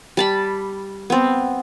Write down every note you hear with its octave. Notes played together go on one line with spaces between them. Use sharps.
G3 A5 B5
B3 C4